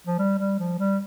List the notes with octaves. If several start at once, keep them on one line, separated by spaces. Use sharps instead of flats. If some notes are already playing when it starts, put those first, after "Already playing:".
F3
G3
G3
F3
G3